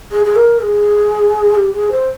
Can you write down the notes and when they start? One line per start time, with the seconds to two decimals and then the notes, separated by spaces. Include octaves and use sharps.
0.11 G#4
0.25 G#4
0.35 A#4
0.60 G#4
1.55 G4
1.73 G#4
1.91 C5